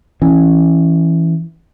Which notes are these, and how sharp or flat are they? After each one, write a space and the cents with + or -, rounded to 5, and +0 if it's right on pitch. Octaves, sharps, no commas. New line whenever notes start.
E3 +0 C#4 -10